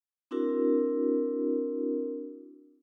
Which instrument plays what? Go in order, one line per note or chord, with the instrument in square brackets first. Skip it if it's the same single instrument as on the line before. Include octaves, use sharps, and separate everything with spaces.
[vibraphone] C4 D4 E4 F#4 A#4